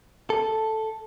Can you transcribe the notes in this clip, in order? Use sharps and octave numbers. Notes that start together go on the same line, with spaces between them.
A4